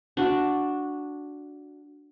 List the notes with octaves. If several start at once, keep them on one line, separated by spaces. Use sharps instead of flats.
D4 F#4